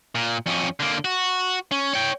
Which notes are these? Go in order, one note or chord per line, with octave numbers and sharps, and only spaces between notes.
A#2
F2 C#4
D3 A#3
F#4
C#4
C#5 G5